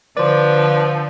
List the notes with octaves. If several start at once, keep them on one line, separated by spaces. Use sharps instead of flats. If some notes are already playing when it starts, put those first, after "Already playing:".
D3 F3 B4 C5 D5